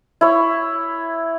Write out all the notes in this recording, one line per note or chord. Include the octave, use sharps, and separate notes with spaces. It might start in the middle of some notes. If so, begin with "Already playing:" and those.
E4 C#5